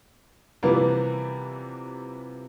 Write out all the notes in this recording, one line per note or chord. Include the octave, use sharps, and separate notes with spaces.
C3 E3 F3 G3 A#3 B3